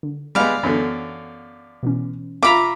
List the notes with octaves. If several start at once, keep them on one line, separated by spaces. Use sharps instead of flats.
D3
G3 G#3 B3 D5 F5
F#2 D3 E3 B3
B2 E3 C#4
F4 E5 F5 A#5 B5 D6 A#6